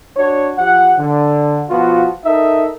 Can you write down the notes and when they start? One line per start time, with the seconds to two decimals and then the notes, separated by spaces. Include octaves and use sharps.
0.17 D4 F#4 C#5
0.58 F3 G4 F#5
0.98 D3
1.69 B2 F3 B3 F4 F#4
2.25 D#4 A4 A#4 E5